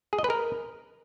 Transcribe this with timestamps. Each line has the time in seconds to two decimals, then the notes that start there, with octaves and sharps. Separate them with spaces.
0.13 G#4
0.18 D#5
0.24 B4
0.30 A#4